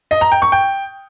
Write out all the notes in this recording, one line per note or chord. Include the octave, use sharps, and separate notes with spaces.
D#5
A#5
G5
C#6
G5